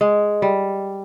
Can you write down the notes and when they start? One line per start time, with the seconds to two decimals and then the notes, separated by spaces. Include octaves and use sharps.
0.01 G#3
0.42 G3